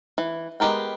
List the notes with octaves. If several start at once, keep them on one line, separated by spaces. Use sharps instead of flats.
E3
G#3 B3 G4 A#4 G5